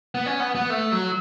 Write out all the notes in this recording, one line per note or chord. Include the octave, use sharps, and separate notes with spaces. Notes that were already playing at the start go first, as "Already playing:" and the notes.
B3
C#4
B3
B3
A3
F#3